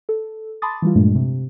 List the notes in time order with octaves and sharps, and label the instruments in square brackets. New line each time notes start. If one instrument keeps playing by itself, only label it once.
[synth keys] A4
A5 B5 C6 D6 D#6 A6
E3 G3 F4
G2 A#2 G#3 A3 D4
C3